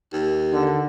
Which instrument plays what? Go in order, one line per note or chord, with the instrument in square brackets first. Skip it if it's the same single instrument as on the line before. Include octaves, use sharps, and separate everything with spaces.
[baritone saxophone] D#2
[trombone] D3